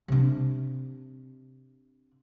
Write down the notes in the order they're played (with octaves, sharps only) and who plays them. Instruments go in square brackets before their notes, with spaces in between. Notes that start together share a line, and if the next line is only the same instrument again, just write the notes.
[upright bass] C3 D4